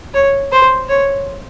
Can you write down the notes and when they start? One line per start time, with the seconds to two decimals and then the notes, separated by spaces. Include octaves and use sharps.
0.14 C#5
0.52 C5
0.89 C#5